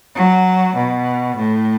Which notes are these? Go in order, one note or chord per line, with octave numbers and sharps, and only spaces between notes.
F#3
B2
A2